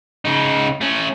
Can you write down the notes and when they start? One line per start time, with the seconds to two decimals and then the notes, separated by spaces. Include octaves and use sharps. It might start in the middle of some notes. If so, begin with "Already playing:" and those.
0.25 C#3 D#4
0.81 A3 C#4